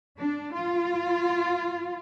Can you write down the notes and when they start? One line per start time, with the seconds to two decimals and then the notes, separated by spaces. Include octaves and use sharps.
0.17 D4
0.52 F4